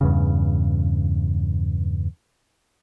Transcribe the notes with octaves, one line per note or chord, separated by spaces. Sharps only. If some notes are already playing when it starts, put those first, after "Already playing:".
E2 G2 C#3